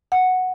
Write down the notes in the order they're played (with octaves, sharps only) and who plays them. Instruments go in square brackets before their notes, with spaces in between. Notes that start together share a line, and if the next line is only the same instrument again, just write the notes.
[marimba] F#5